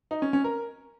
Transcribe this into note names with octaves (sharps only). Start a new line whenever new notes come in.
D#4
C#4
C#4
A#4